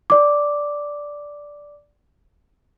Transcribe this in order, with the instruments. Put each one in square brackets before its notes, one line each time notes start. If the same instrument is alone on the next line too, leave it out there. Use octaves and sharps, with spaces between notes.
[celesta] D5 D6